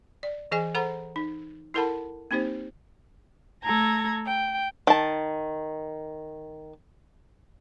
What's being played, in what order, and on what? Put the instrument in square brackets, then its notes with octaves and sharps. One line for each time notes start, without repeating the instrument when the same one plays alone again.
[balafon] D5
E3 G#4 D#5 G#5
A4 C5 F#5 A#5 B5
D#4
E4 A4 A#4 F#5 A5 B5
A#3 C4 D#4 G4 C5
[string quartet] A3 A4 A#5 G#6 A#6
G5
[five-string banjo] D#3 A5